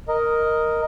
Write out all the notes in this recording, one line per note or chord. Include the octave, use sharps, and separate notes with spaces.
A#4 D#5